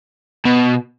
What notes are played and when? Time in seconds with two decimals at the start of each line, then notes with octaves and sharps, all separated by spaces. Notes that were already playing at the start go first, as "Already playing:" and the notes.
0.46 B2